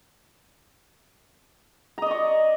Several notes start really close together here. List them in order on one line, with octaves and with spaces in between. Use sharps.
A#5 D#5 D5 C#6